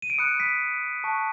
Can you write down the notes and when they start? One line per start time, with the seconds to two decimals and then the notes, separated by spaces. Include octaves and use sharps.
0.02 D#7
0.10 D7
0.18 B5 D#6 F#6 C#7
0.40 B6
1.04 A5 C#6 F#6